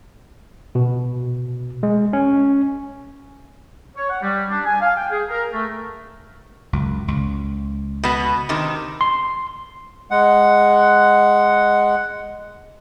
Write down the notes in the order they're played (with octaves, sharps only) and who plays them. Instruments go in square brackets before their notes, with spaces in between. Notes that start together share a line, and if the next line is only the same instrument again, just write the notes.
[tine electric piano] B2
G#3
C#4
[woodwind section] C#5
F#5
G3
D4
G#5
F5
G5
G#4
A#4
A3
[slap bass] C#2 F#2
C#2
[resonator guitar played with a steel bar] B2 B3
C3 D#3
[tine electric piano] C6
[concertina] G#3 F#5